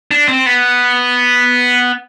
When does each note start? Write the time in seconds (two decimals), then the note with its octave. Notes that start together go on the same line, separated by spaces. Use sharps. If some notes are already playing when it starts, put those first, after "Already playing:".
0.11 D4
0.28 C4
0.46 B3